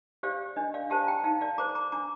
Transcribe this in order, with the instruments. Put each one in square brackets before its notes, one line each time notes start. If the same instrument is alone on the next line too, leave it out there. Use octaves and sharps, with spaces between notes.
[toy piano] G4 C5 D5 F5
D4 D#5
D5 F5
G4 C5 F5 A5
G5 A#5
D#4 F5 A5
D5 F5
A4 C5 A#5 D6
A#5 D6
D4 A#5 D6